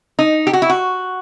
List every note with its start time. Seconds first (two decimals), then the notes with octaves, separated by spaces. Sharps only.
0.19 D#4
0.47 G4
0.53 F#4
0.62 E4
0.70 F#4